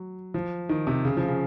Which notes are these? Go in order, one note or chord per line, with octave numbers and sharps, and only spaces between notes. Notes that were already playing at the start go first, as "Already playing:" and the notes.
Already playing: F#3
F3
D#3
C3
C#3
F3
C#3